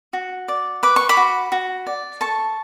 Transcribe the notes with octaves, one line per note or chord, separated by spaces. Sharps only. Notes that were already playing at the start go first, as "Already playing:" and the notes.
F#4
D5
B4 D6
C#6
B5 D6
F#4
F#4
D5
A4 A5 C#6